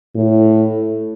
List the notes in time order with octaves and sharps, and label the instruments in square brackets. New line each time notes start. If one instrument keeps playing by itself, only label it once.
[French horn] A2